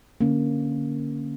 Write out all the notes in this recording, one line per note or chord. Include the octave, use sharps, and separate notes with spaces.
D3 A#3 C#4